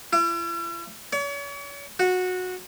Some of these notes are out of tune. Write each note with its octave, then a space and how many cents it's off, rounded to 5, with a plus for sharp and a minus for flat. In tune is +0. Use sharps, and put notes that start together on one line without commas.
E4 +45
C#5 +40
F#4 -15